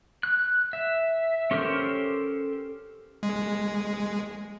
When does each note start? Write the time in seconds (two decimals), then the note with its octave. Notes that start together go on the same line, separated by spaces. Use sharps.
0.23 F#6
0.73 E5
1.51 C#4 G4 A4 A#4 C5
3.23 G#3